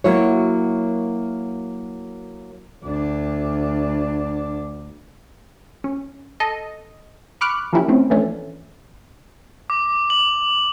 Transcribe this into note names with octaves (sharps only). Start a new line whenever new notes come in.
F#3 A#3 E4 F#4 C#5
D2 D4
C#4
A4 D#5
B5 C#6 D6 F6 F#6
F3 A#3 C#4 E4 G4
A3 C4 C#4
E3 F3 A3 C#4 D4
D6
F#7